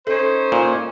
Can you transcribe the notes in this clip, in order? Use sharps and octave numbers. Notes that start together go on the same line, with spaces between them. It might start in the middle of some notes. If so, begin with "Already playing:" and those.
C#4 D#4 A4 C5
A#2